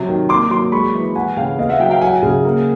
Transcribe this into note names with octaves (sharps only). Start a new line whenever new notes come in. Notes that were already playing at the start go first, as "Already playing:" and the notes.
Already playing: C3 F#3
D#3
A#3 C6 D6
F#3 C6 D6
G#3 B5 C#6
E3
E3 F#5 G#5
C#3 F5 G5
B3 D#5 F5
E5 F#5
F#3 F5 G5
F5 G5
F#3 F#5 G#5
C#3
A#3